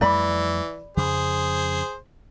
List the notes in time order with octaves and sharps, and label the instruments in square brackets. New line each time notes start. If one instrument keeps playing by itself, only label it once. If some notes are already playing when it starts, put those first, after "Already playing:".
[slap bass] F2 G3 A3 [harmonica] E3 [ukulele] D5 B5
[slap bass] F2 C#3 [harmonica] G#4 C5